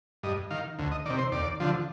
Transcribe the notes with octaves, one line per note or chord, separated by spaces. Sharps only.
G2 D#5
D#3 F5
D2
D#5
C3 D#3 D5
C5
D#2 D5
D3 F3